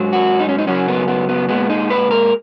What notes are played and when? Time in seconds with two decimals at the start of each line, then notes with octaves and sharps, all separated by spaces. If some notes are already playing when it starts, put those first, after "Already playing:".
Already playing: G#2 F#3
0.13 F#4
0.40 D#4
0.49 C#4
0.58 D#4
0.67 F#2 C#3 F#3 C#4
0.88 B3
1.08 B3
1.29 B3
1.49 A#2 G#3 B3
1.70 D#4
1.90 B4
2.11 A#4